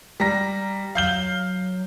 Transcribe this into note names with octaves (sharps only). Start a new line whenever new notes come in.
G3 A#5 A#6
F#3 F5 G6 G7